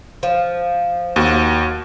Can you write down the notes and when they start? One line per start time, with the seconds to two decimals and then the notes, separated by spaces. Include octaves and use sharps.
0.23 F3
1.16 D#2 F#4